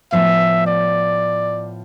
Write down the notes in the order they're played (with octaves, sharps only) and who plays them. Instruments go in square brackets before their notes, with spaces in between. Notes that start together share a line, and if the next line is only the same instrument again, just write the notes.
[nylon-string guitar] A2 F3 B3 [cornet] E5
[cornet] D5